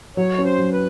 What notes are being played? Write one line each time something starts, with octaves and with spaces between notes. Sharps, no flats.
F#3 C#5
C#4
C5
F#3
B4